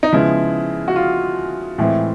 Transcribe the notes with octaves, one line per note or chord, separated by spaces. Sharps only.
D#4
C#3 F3 G#3 B3 E4
F#4
F4
A2 E3 G#3 C4